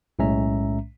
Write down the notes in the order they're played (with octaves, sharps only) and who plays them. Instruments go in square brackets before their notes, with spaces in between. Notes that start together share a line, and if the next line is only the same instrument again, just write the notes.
[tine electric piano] B1 A2 G#3 C#4 E5 A#5